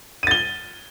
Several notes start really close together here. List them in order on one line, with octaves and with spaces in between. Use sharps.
D#7 A6 G7